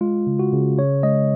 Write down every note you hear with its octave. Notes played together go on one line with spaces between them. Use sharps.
G#3 F4
C#3
F#4
C#3
C#3 C#5
G#3 D#5